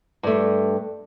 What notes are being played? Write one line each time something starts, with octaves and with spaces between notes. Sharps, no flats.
G2 A3